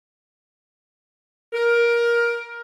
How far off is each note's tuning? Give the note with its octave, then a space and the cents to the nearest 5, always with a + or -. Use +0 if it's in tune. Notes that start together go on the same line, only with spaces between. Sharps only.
A#4 +15